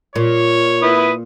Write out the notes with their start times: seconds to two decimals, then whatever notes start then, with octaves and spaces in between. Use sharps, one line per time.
0.16 A#2 F4 C#5
0.82 E4 B4 D#6